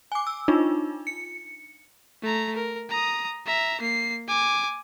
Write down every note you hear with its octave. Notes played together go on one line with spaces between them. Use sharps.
G#5 D6
E6
D4 D#4 F4
C#7
A3 A#5
A#4
A#5 D#6
E5 A#5
A#3 C7
G#5 D6